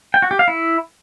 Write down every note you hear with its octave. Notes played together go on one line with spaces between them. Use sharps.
G5
F#4
G4
F5
E4